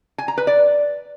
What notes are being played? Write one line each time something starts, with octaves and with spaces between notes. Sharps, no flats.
G#5
A#5
B4
D5